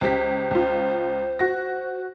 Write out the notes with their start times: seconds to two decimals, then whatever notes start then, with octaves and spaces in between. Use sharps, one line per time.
0.01 C#2 G4 C5 B6
0.51 C#2 F4
1.39 F#4 A#6